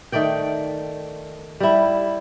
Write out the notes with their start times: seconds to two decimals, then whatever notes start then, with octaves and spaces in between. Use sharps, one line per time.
0.12 D#3 A3 D5 G5
1.60 G3 E4